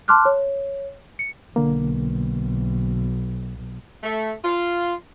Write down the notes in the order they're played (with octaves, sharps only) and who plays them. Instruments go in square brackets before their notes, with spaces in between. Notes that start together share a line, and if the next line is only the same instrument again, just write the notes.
[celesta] A5 C6 D6 F6 F#6
C#5
C#7
[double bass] B1 [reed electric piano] D3 A#3
[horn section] A3
F4